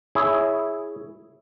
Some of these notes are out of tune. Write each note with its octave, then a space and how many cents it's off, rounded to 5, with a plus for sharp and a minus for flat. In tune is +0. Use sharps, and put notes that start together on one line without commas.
E4 +0 G#4 +0 C#5 +5